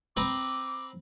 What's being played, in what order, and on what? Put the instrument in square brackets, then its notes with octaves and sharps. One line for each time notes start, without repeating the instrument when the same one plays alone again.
[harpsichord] C4 B4 A#5 [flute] D6